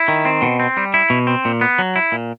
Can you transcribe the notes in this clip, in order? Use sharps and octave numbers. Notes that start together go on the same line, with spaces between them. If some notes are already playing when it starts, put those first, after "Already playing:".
Already playing: E4
D#3
C4
B2
C4
G3
E4
B2
C4
A#2
B3
F#3
E4
A#2